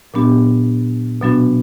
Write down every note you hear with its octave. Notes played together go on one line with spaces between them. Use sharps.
A#2 F#3 B3 D4 G4
B2 F#3 B3 D4 F#4